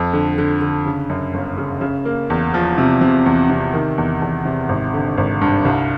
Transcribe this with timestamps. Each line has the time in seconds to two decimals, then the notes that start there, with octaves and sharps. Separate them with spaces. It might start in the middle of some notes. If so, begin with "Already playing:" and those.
Already playing: F2
0.13 D3
0.38 D3
0.61 D3
0.86 C#3
1.10 F#2
1.34 G1
1.57 C#3
1.81 C#3
2.05 A#3
2.30 E2
2.54 F3
2.78 C3
3.01 C3
3.26 E2
3.50 C3
3.74 D#3
3.98 E2
4.22 E2
4.45 C3
4.69 G#1
4.94 D3
5.18 G#1
5.41 G2
5.65 C2